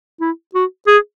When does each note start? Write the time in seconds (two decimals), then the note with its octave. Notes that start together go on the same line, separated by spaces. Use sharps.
0.21 E4
0.54 F#4
0.87 G#4